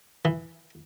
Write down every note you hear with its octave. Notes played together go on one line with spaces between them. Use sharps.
E3